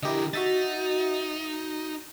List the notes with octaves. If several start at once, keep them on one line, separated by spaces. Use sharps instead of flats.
D3 E4 G4 A#4 D#5
D#4 F#4 E5 A6